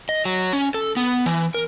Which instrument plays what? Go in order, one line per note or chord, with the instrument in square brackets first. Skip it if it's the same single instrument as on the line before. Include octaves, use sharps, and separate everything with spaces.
[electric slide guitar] D#5
F#3
C#4
A4
B3
E3
A#4